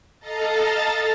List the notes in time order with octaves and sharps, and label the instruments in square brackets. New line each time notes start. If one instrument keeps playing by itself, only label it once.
[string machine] A4 D#5 F5 A5 A#5 A6